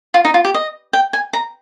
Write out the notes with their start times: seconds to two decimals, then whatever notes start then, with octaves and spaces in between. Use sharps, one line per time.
0.14 F4
0.25 D#4
0.34 F4
0.45 G4
0.54 D#5
0.93 G5
1.13 G#5
1.33 A#5